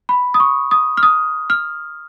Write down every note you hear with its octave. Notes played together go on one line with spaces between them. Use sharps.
B5
D#6
C#6
D#6
F6
D#6
F6